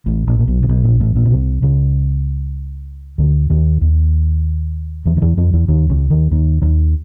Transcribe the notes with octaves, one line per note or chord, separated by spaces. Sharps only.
A1 A2
A#1 A#2
A#2
B1 B2
C3
B1 B2
A#1 A#2
A1 A2
A#1 A#2
B2
C2 C3
C#2 C#3
D2 D3
D#2 D#3
D#2 D#3
E2 E3
D#3
E2 E3
F2 F3
E2 E3
D#2 D#3
C#2 C#3
D#2 D#3
D#2 D#3
D#2 D#3